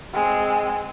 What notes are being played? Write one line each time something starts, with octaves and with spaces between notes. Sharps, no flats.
G#3 C4